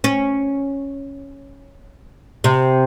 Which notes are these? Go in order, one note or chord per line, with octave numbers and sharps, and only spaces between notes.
C#4
C3